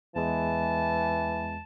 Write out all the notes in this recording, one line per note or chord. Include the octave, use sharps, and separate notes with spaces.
E2 E3 G#3 A5